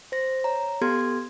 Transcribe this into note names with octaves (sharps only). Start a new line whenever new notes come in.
C5 A#6
C#5 A#5
B3 G4 A4 C6 G#6